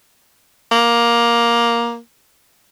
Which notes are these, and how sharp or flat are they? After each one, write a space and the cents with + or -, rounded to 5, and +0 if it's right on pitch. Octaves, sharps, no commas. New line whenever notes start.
A#3 +10